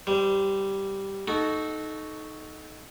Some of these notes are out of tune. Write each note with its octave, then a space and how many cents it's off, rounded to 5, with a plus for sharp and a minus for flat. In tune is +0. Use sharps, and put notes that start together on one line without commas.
G3 -5 C5 -35
D#4 +0 F#4 +0 A4 -20